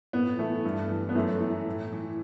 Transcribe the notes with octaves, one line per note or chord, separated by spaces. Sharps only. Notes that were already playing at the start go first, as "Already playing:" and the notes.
A2 B3
E3 A3
G2
E3
B3
F#2 A3
E3
A2
E3